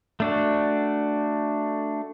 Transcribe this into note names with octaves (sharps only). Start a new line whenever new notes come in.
A3 D4 F#4